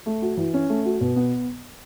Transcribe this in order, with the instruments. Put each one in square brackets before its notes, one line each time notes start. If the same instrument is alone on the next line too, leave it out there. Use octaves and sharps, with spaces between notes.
[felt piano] A3
F#4
E3
C#4
A3
F#4
B2
B3